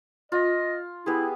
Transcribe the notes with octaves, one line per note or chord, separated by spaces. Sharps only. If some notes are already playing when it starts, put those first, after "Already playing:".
F4 D#5
B3 E4 G4 G#4